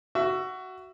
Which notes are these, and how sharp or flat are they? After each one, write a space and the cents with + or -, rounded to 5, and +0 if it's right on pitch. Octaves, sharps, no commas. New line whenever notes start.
F#4 +10 E5 +25